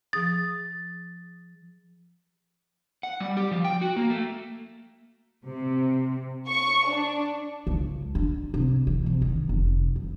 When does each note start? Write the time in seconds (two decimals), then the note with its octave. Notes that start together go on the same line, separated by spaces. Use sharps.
0.13 F3 G#4 D#6 A6
3.03 F#5
3.20 G3
3.37 G4
3.51 F3
3.65 G5
3.81 F#4
3.96 A#3
4.10 A3
5.46 C3
6.49 C#6
6.88 D4
7.67 C#2
8.15 D4
8.54 C3
8.87 E3
9.06 C3
9.22 D#3
9.49 F1
9.96 F2